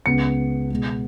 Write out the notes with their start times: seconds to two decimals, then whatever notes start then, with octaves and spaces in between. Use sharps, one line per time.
0.06 C#2 C#3 G#3 B3 C#7
0.71 B2 G#3 B3